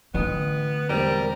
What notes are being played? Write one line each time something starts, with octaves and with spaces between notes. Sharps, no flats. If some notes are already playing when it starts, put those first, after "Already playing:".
A1 D3 B3 D#6
E1 G3 C4 A#4